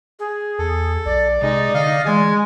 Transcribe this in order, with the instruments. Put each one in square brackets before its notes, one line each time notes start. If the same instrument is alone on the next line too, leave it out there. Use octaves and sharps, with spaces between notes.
[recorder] G#4
[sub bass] E2 [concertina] A4
[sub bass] B1 [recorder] D5
[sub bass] C3 [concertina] G#3 [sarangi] D#4
[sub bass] D3 [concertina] D#5 F5
[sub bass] E3 [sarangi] G#3 [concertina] G#5